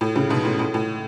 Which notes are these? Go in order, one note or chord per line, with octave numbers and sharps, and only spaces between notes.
A2
A2 C#3
G#2 B2
A2
A2
A2